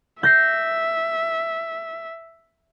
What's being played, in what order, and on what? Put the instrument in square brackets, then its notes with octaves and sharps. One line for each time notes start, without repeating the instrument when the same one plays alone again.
[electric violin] E5 [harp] G6 A#6 C7